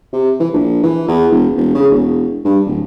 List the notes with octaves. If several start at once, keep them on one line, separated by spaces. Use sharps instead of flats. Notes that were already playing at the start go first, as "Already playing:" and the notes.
C3
E3
A#1
E3
E2
E1
E1
C#3
E1
G2
D1